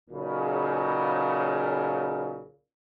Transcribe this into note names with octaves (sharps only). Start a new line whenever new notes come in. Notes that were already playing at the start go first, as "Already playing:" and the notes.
B1 A#2 C#3